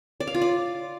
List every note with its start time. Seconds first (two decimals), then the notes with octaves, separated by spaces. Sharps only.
0.20 D5
0.27 F5
0.34 F4
0.42 D5